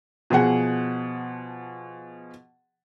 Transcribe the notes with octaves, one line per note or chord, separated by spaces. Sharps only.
B2 F3 G#4 F#5